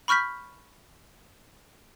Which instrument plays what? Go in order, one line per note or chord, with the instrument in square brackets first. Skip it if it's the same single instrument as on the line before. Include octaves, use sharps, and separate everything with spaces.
[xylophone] B5 C#6 F6 G6 B6